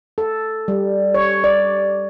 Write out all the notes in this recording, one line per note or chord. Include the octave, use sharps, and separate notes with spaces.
A4
G3
C#5
D5